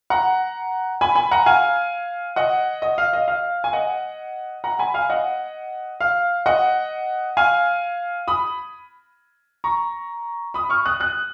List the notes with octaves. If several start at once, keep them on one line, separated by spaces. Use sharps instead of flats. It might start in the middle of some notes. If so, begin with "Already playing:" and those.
F#5 A#5
G#5 B5
G#5 B5
F#5 A#5
F5 G#5
D#5 F#5
D#5
F5
D#5
F5
G#5
D#5 F#5
F#5 A#5
G#5 B5
F5 G#5
D#5 F#5
F5
D#5 F#5
F5 G#5
B5 D#6
A#5 C#6
B5 D#6
C#6 F6
D#6 F#6
D#6 F#6